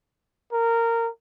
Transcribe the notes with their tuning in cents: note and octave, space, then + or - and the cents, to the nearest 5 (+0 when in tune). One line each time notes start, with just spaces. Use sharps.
A#4 -15